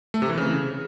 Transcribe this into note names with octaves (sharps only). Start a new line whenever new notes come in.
A3
C3
E3
C#3